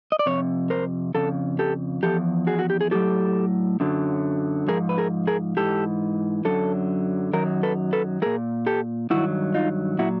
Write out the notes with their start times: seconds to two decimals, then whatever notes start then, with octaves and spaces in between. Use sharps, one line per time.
0.12 D#5
0.19 D5
0.26 F2 C3 C#5
0.70 A#4 C5
1.14 F2 C#3 A4
1.59 G4 A4
2.03 E2 C#3 F3 G4 A4
2.47 F#4 G#4
2.59 F#4
2.70 G4
2.81 G#4
2.91 A2 F#3 G4 A4
3.80 F#2 D3 F#3
4.68 G#2 F3 G#4 A#4
4.89 B4
4.98 G#4 A#4
5.27 G#4 A#4
5.57 G#2 E3 G4 A4
6.45 F#2 D3 F#3 A4
7.33 F#2 D#3 F#3 A#4
7.63 A4 B4
7.93 A4 B4
8.22 A#2 F#3 G#4 A#4
8.67 G4 A4
9.10 G2 D#3 F#3 E4 F#4
9.54 D#4 F4
9.99 A#2 F#3 E4 F#4